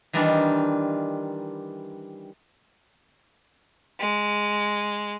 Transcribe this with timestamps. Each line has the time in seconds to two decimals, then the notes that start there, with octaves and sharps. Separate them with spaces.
0.13 D#3 E3 G3 D4 D#4 F4
4.00 G#3